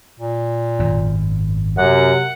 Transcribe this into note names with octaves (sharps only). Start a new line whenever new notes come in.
A#2
G#1 F#2
F#2 C3 F#5